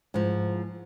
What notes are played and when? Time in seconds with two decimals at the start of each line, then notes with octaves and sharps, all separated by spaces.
0.14 G#2 F3